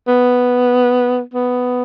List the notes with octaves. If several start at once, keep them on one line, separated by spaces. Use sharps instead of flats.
B3
B3